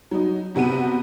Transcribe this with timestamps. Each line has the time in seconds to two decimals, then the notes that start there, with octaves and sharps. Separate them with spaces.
0.11 F#3 D#4
0.55 G1 C3 B3 F#4 D#7